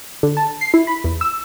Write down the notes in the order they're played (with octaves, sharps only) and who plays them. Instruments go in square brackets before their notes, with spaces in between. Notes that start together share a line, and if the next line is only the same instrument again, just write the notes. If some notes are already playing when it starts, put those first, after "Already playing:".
[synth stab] D3
A5
C7
E4
B5
E2
E6